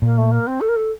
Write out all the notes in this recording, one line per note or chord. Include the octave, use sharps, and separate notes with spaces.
A#2 A#3
A3
A#3
C4
A4
A#4
A4